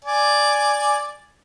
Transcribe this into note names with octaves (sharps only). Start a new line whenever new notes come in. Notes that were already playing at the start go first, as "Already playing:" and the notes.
D5 G#5